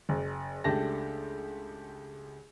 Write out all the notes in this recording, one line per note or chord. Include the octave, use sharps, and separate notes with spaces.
F#1
C#2 A3 D4 G4 A5 A#6